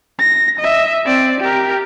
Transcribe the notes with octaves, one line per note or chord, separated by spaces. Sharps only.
A#6
D#5 E5
C4 D5
G4 A#4